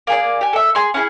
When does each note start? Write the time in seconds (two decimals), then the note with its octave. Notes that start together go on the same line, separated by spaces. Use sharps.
0.07 A#3 G#4 D5
0.41 G4 G#5
0.53 A4 E5
0.75 G#4 C6
0.94 C#4 E4 G#4